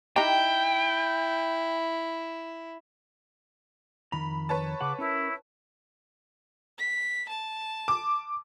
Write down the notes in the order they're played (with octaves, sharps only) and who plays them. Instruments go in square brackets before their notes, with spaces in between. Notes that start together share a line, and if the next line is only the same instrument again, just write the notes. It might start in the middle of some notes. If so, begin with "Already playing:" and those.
[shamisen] D#4 G4 [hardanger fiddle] E4 [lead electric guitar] G5
[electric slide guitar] F2 D#3 A#5 [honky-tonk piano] B5
[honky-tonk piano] B4 C#5 A5
[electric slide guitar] C#3 G#4 F#5 [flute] D6
[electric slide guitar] C#4 A#4 [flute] E4
[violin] B6
A5
[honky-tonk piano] D6